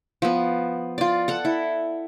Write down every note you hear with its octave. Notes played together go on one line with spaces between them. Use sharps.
F3 B3
F4 D5
A4 F#5
E4